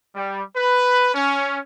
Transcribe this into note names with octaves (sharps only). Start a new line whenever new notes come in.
G3
B4
C#4